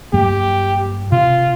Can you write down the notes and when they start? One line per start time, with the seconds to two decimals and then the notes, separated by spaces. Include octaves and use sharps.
0.13 G2 F#3 A#3 G4
1.12 C3 F4